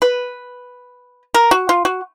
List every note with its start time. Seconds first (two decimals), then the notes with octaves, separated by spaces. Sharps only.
0.02 B4
1.34 A#4
1.51 F#4
1.69 F4
1.85 F#4